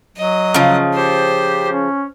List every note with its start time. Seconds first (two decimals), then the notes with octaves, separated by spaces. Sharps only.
0.17 F#3 D#5
0.54 C#3 F3
0.94 G4 C5
1.72 C#4